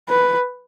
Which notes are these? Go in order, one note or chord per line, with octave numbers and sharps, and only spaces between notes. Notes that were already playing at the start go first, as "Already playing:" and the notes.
B4